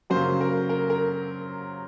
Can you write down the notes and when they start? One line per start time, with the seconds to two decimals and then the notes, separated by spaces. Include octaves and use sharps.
0.10 F#2 C#3 F#3 A#3 C#4 C5
0.41 A#4
0.69 A#4
0.90 A#4